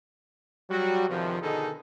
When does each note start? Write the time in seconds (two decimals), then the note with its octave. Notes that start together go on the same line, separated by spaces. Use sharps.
0.70 F#3 G3 F#4
1.09 E2 C3 D#3 F3
1.41 B2 D3 D#3 D#4 G#4 A4